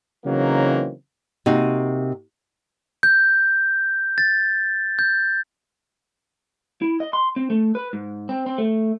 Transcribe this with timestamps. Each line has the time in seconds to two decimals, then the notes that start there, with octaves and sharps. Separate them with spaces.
0.25 C#3 E3 F#3 A#3 C4 D#4
1.46 C3 A#3 D#4 F#4
3.03 G6
4.18 A6
4.99 G6
6.82 E4
7.00 D#5
7.13 C6
7.36 C4
7.50 A3
7.75 B4
7.93 G#2
8.29 C4
8.46 C4
8.58 A3